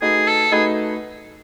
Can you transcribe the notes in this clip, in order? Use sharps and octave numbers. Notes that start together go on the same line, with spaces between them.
A3 D#4 F#4 G#4 B4 D#5
A4
A3 D#4 F#4 G#4 B4 D#5